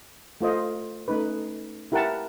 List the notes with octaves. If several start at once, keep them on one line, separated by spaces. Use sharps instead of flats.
A3 F4 C5 D#5
A3 C#4 D#4 B4
E4 G4 A#4 E5 F#5 A5